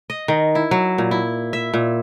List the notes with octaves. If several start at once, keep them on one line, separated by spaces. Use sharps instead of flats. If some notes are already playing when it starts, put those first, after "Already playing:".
D#5
D#3
E4
F#3
A#2
E4
E5
A#2